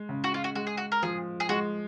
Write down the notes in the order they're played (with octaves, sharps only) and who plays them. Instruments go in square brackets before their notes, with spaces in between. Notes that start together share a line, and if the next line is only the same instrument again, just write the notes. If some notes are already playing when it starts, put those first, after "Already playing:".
Already playing: [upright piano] G#3
C#3
[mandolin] F#4
F4
F#4
[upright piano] G#3 [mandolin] F#4
[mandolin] G#4
F#4
A#4
[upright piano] F3 [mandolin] G#4
[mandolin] G#4
[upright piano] G#3 [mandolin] F#4